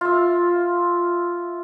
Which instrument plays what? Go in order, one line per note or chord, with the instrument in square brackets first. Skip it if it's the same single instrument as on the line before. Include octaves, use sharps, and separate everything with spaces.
[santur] F4 E5